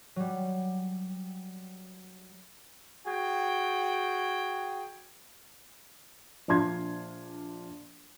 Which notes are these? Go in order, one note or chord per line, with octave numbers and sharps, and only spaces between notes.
F#3 G3
F#4 G#4 G5
A#1 D4 F4 C6 G#6